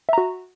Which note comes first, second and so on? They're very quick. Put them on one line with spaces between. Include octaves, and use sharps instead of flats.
E5 A#5 F#4